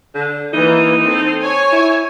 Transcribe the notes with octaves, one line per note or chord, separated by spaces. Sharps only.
D3
E3 A#3 D#4
C4 A4 C5
C#5 G#5
E4